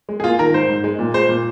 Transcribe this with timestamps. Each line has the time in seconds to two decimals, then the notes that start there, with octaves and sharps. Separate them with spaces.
0.09 G#3
0.20 G#4
0.24 A#3 F4
0.39 D#3 A#4
0.54 G#2 C5
0.69 G#2
0.84 G#3
0.99 A#2
1.14 G#3 C5
1.29 A#2